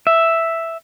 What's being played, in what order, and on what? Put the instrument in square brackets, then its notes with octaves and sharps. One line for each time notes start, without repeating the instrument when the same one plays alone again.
[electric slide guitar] E5